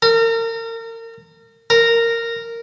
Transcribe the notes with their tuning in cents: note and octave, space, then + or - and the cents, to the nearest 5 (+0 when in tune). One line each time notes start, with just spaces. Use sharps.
A#4 -35
A#4 -10